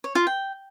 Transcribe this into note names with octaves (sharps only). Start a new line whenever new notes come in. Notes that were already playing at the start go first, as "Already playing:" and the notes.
C#5
F4
G5